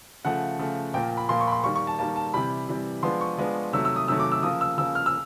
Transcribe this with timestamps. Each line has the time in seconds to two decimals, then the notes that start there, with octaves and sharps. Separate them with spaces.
0.25 C#3 F3 A3 F#5
0.59 C#3 F3 A3
0.94 A#2 F3 A#3 G5
1.17 B5
1.29 A#2 F3 A#3 C6
1.41 C#6
1.47 B5
1.52 C6
1.64 D#3 G3 A#3 C#6
1.75 C#6
1.87 A5
1.99 D#3 G3 A#3 A5
2.16 A5
2.34 C3 E3 G3 B5
2.68 C3 E3 G3
3.03 F3 G#3 B3 D4 C6
3.21 C#6
3.38 F3 G#3 B3 D4
3.73 C3 D#3 F#3 A3 E6
3.85 E6
3.96 D#6
4.08 C3 D#3 F#3 A3 E6
4.20 D6
4.32 E6
4.43 C#3 F3 A#3 D#6
4.61 E6
4.78 C#3 F3 A#3 E6
4.95 F6
5.06 E6